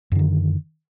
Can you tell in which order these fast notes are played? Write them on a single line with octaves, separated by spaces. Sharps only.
F#2 D3 D#3